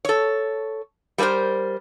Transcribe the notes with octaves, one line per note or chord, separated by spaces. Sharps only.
A4 C#5
G3 A#3 C#4 A#4 C5